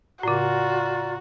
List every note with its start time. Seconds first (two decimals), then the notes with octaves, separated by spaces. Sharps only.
0.23 A2 C#3 F4 F#4 D5 A#5